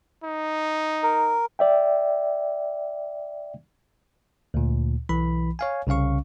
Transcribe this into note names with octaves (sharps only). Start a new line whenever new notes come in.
D#4
A#4
D5 E5 G5
D2 A#2
B1 E3 B5
C#5 F5 G#5
C2 C#3 C#4 F5 C#6